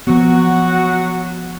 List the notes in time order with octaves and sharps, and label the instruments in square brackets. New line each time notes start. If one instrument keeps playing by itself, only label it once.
[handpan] F3 B3 [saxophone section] F#3 F#4